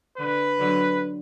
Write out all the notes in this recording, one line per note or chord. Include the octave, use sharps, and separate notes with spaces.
D3 B4
D3 F#3